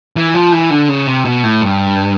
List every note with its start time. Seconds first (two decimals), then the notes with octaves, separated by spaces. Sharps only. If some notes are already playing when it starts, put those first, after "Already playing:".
0.17 E3
0.34 F3
0.52 E3
0.70 D3
0.89 C#3
1.07 C3
1.25 B2
1.43 A2
1.62 G2